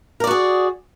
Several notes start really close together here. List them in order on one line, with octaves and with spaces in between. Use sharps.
A#4 D5 F#4 G#4